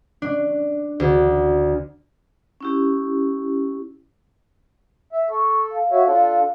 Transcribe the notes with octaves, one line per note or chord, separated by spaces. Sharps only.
D4
D2
C#4 E4 G4
E5
A4 C#6
F5
F#4 C#5 E5
D4 F4 A4